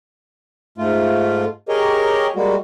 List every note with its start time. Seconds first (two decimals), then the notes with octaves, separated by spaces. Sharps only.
0.78 G#2 A3 F4
1.69 G4 G#4 A#4 C#5 D#5
2.36 G3 G#3 A#3 F#4